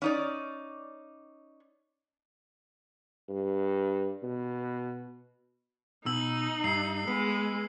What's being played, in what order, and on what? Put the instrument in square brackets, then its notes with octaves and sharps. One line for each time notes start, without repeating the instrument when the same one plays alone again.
[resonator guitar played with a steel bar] C#4 D#4 D5
[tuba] G2
B2
[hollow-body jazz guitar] B2 [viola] D#4 [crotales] E6 F#7
[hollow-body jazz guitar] G2 [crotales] C7
[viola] G#3 [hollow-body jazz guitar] B3